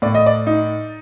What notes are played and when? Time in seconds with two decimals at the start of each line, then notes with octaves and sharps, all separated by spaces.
0.02 A2 D5
0.14 D#5
0.26 D5
0.47 D#4